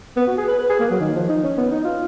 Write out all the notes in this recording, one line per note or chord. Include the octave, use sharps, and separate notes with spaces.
B3
F#4
G#4
B4
B4
G#4
A#3
F#3
D#3
F3
D#4
C#4
B3
D#4
F4